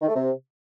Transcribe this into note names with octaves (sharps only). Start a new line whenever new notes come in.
D#3
A3
C3